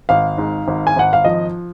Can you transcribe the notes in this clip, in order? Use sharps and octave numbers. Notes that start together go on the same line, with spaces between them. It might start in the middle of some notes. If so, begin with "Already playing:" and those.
G#1 F5
G#2
G#1
G#5
G#1 F#5
F5
F3 D#5